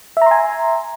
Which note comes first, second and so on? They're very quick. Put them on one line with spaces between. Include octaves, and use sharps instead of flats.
E5 A#5 C6 G#5